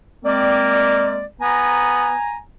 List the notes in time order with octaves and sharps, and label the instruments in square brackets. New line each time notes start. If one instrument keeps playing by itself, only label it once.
[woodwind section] G#3 C4 D5 [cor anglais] A#3
[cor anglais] B3 [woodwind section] G#5 A#5